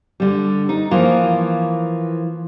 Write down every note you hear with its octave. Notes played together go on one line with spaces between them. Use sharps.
D3 G3
D#4
E3 F3 A#3 F4